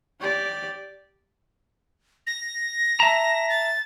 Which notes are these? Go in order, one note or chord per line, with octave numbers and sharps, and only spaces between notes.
G4 D5
A#6
E5 A5 A#5
A6